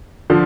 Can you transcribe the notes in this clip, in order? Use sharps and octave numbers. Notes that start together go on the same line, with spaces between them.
D3 F3